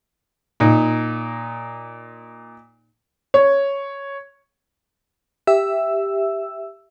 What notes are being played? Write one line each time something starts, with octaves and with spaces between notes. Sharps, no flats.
A#2 D#4
C#5
G4 E5 E6